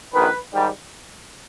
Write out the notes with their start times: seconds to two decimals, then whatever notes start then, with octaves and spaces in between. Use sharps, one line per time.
0.13 A#1 G#2 D#3 B4
0.53 G#2 D#3 G3